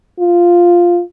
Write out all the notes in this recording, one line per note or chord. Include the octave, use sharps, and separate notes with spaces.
F4